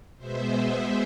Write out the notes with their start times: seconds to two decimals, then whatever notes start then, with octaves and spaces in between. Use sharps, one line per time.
0.18 B2 G#3 B3 C5 E5
0.55 C5 E5